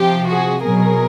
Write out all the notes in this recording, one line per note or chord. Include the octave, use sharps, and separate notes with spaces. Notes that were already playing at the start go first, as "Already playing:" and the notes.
Already playing: C3 F3 G4
F#4 G#4
B2 F#3 G#4 A#4